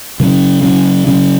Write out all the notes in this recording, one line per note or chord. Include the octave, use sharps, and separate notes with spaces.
C#3 F#3 C#4
C#3 F#3 C#4
C#3 F#3 C#4